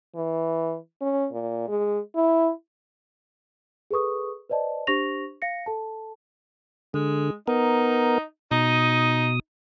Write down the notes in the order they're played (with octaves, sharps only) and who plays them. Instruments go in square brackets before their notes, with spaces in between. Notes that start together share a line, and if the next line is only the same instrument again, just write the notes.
[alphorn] E3
C#4
A#2
G#3
E4
[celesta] G#4 A4 B4 C#6 D#6
B4 C5 D5 D#5 A5
D4 G4 C5 C#6 A#6 F7
F5 A#6 C#7
A4 A5
[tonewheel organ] D3 [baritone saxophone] G#3
[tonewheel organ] B3 A#4 [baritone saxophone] D#4
[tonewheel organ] B2 D#6 [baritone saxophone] D#4